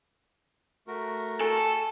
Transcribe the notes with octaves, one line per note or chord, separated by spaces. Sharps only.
A3 F#4 A#4
A4 G#5 A5